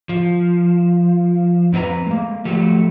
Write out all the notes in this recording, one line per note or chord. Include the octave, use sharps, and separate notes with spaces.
F3
F2 C4 F4 B4 A#5
G#3 A#3
F3 F#3 A3 G4